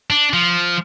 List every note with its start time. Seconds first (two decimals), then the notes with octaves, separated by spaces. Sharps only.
0.10 D4
0.33 F3